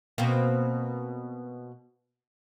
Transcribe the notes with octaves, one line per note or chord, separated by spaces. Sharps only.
B2 A#3 C4